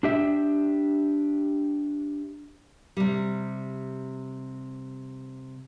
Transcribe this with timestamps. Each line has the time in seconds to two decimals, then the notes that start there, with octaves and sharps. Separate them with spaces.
0.03 D4 G4 E5
2.97 C3 G3